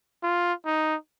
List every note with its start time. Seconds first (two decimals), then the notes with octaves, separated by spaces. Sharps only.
0.23 F4
0.66 D#4